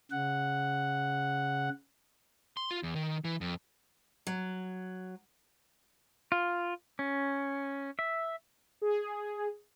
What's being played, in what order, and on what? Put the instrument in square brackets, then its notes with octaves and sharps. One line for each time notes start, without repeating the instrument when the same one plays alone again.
[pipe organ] C#3 F#5
[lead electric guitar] C6
F4
E2
D#3
E3
F2
[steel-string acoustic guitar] F#3
[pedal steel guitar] F4
C#4
E5
[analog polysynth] G#4